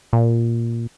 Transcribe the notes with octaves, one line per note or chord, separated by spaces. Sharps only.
A#2